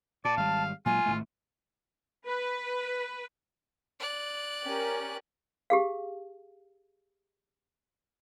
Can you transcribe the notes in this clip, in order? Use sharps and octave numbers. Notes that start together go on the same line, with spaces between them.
A#2 D5 A5
G#1 G3 F5
A#2 F#3 G#3 F4 G#5
G#1 A2 A3
B4
D5 F#6
C#4 G4 A#4
G4 G#4 F5